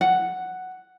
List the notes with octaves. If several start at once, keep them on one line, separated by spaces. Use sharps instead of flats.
F#5